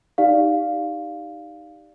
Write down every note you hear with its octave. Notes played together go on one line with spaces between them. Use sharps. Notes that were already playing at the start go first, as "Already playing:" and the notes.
D#4 G4 D5 F5